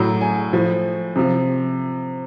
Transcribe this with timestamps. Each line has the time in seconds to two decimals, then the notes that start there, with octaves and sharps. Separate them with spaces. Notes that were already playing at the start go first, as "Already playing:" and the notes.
Already playing: A2 F#3 A#5
0.21 G#5
0.53 A2 F3
1.16 C3 F3